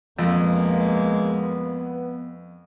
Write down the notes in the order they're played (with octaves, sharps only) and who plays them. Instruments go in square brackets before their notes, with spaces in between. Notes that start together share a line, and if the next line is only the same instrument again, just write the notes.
[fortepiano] F2 [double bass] G#3 A#3 [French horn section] B3